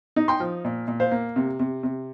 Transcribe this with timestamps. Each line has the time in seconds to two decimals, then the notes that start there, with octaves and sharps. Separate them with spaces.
0.16 D#4
0.28 G5 C6
0.40 F3
0.64 A#2
0.88 A#2
1.00 C5 F5
1.11 A#3
1.36 C3
1.59 C3
1.83 C3